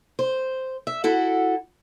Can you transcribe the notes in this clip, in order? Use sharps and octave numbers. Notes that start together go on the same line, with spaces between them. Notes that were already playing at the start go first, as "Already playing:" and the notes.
C5
E5
E4 F#4 A4 F#5